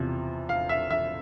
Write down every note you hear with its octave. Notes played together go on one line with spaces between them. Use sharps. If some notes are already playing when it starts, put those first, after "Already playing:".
Already playing: E2 C3 F3
F5
E5
E5